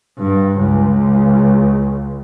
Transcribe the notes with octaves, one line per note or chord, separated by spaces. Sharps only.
G2
C#2